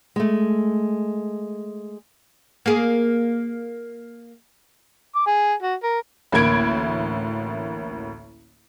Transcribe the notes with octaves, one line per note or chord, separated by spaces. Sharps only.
G#3 A3
A#3 G#4
D6
G#4
F#4
A#4
A1 D2 A#3 B5 G#6 D7